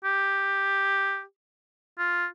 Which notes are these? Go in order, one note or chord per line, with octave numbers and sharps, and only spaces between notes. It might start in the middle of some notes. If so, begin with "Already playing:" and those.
G4
F4